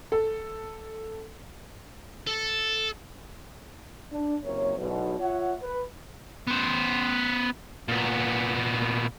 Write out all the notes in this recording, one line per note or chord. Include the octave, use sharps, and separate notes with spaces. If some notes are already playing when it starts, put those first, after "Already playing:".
A4
A4
D4
F#1 C3 A#3 C#5
B1 E2 G#2 B2
F4 C#5 E5 F#5
B4
B3 C5
A#2 B3